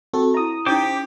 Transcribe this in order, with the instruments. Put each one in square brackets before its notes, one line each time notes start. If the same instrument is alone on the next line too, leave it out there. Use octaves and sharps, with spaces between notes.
[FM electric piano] C4 F#4 A4 [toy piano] G4
[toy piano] E4 D#5 [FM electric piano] A#5 D#6
[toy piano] C#4 D#4 [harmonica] G4 [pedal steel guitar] C5 D6